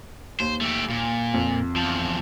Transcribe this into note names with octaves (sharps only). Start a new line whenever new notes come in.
D#2 C5
A3 G4
A#2
F2
E2 F3